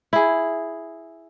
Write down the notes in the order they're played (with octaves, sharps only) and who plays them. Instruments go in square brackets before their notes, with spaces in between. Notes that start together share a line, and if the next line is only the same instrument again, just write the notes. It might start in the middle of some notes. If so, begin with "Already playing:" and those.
[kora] E4 G#4